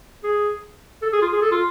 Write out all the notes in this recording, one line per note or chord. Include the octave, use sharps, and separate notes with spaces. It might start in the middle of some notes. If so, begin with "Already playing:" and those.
G#4
A4
G#4
F4
G#4
A4
F4